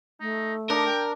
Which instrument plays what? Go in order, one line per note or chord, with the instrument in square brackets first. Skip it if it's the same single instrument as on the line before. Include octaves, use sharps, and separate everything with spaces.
[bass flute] A3 [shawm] D#4
[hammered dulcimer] D4 [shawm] D#4 [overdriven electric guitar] A#4
[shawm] G5